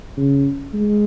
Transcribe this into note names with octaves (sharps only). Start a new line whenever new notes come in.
C#3
G#3